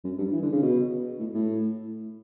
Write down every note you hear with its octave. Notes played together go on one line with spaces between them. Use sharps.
F#2
G2
E3
D3
C#3
B2
A2
A2